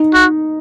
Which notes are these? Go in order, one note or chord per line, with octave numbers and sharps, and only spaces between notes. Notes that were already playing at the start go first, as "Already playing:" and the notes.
Already playing: D#4
F#4